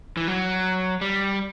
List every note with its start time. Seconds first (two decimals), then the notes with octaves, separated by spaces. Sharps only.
0.17 E3
0.28 F#3
1.01 G3